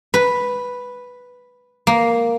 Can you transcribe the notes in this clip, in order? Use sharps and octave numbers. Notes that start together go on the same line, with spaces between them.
B4
A#3